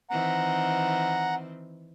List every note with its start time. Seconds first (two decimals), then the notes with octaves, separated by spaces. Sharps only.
0.11 D#3 E3 C4 F#5 A#5